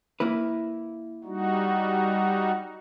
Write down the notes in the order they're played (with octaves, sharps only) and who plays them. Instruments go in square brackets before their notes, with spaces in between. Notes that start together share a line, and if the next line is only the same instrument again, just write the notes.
[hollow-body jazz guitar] A#3 E4 B4
[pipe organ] G3 D#4 F#4